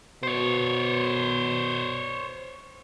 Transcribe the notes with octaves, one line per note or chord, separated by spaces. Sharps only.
B2 C5 C#5